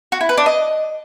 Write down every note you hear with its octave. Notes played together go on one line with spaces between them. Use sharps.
F#4
E4
B4
D4
D#5